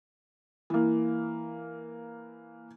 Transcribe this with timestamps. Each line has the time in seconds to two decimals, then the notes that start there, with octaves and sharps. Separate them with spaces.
0.70 E3 A#3